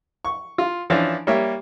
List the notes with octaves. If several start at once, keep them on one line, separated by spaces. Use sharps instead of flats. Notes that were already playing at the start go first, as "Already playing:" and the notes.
C#6
F4
E3 F3 C#4 D4
G3 A#3 C#5 E5